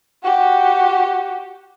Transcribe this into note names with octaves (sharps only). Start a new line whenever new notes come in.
F#4 G4